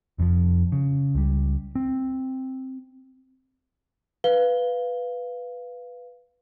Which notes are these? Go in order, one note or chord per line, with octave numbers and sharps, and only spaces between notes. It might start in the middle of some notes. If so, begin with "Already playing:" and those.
F1 F2 A2 F3
C#3
C#2 G3
C4
B4 F5 G7